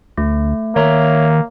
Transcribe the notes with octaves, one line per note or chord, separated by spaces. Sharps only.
D2 A3
D#3 A#3 C#5 E5 A#5